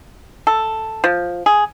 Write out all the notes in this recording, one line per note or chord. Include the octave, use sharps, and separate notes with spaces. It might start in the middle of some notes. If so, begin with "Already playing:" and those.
A4
F3
G#4